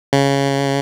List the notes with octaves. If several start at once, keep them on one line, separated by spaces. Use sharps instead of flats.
C#3